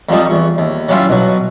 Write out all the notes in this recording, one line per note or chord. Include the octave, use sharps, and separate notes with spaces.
F2 F3 G3 D#4
E2 C#6
D#2
F#3 G3 C#4 E4 F4
B2 F#3